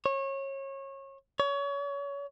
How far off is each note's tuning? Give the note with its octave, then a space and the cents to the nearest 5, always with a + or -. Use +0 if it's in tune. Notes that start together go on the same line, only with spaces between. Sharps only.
C#5 -25
C#5 +30